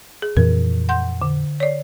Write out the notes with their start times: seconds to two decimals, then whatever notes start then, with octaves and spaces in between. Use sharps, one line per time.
0.22 G#4
0.37 F2 A#2 E3 A#4
0.89 F#5 C6 G6
1.22 D3
1.60 C#5 D5